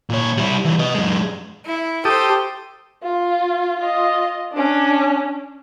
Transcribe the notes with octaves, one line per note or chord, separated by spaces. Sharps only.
A#2 C#5
G3 E4
E3 G3
B4 D#5
F#2 G#3
E4
G4 A4 C5 G5 D#6
F4
F4 D#5
C#4 D4